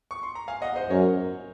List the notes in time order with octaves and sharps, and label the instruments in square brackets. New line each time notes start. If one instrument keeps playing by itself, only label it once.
[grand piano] C#6
C6
A#5
F5 G#5
D#5 F#5
C5 D#5
[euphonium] F#2 [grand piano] A#4 C#5